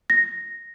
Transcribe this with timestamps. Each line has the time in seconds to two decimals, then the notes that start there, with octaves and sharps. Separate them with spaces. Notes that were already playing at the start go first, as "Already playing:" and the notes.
0.10 A#6